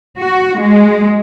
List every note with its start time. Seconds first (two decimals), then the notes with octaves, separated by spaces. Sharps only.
0.20 F#4
0.61 G#3